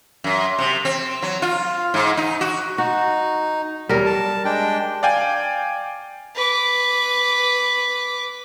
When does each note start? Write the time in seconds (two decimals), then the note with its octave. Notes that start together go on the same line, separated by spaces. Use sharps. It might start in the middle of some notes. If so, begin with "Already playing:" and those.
0.24 F#2
0.59 C3
0.85 C4
1.22 F#3
1.42 F4
1.94 G#2
2.17 D#4
2.41 F#4
2.78 D#4 F#4
3.89 E2 F#3 G3 A#4
4.06 A5
4.45 G#3 D4 G5
5.03 D5 F5 G5 G#5
6.35 B4 D6